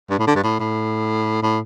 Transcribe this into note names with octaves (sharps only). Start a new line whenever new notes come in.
G2
A2
D3
G2
A2
A2
A2